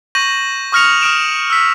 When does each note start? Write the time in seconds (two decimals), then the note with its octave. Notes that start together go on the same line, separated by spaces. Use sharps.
0.15 C#6 G6 A#6 D#7 F#7
0.72 C#6 D#6 F6 A#6 C#7 F7
1.01 D#6 F6 D7 E7
1.50 E6 B6